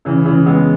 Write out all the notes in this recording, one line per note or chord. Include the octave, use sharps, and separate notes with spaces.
C#3 E3
C#3 E3
G#3 B3